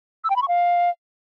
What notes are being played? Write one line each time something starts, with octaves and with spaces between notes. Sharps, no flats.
E6
G5
B5
C#6
F5